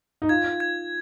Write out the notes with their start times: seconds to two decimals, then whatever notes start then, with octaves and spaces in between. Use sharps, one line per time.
0.22 D#4
0.29 F4 G#6
0.60 G#6